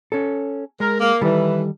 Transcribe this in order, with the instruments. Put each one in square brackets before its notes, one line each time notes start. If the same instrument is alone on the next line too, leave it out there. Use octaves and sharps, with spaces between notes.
[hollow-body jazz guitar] C#4 A4
[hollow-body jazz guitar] G#3 [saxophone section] A#4
[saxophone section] A#3
[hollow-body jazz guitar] D#3 G3 A4 [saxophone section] E3